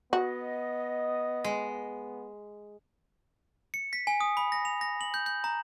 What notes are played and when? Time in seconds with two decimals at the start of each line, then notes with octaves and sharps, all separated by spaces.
0.13 B3 F#4 D#5
1.44 G#3
3.74 C#7
3.93 B6
4.07 G#5
4.21 D#6
4.37 B5
4.52 A#6
4.65 F7
4.81 A#6
5.01 F#7
5.14 G6
5.26 G6
5.44 A#5